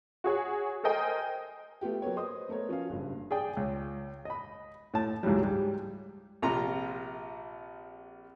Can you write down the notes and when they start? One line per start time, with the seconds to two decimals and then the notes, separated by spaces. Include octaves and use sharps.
0.24 F#4 G#4 C#5
0.84 A4 A#4 C5 D#5 G5 G#5
1.81 A3 B3 F4 G4
2.02 F#3 A#3 B3 C#5
2.16 B4 C5 D#5 C6 D#6
2.49 A3 B3 A#4 C#5
2.69 F3 C#4 F#4 F5
2.90 F#1 G2
3.31 G#4 D5 G5
3.57 C#2
4.25 D#5 B5
4.94 A2 A5
5.23 C#2 G#2 E3 F#3 G3
5.42 G#2 G3
6.42 A#1 C3 F4 A#5